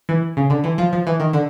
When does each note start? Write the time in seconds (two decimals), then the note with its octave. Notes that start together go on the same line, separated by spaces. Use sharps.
0.09 E3
0.37 C#3
0.50 D3
0.64 E3
0.78 F3
0.93 F3
1.07 E3
1.20 D#3
1.33 D3